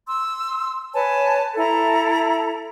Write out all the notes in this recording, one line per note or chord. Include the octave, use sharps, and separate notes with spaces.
C6 E6
B4 C#5 G#5 A5
E4 A4 E5 A#5